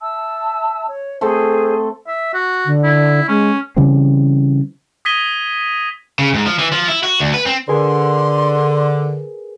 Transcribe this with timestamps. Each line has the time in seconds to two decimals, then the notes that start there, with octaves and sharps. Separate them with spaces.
0.01 E5 A5 E6
0.88 C#5
1.21 A3 C4 G#4 A4 C5
2.07 E5
2.34 F#4
2.66 D3
2.83 E4
3.28 G#3 C#4
3.77 C#3 E3 G3 C4
5.05 D#6 G#6 A#6 B6 D#7 G7
6.19 C#3
6.34 G#2
6.46 F3
6.59 E3
6.72 F3
6.88 E4
7.03 F#4
7.20 D2
7.34 B4
7.46 C4
7.68 D3 G#4 A#4 B4 C6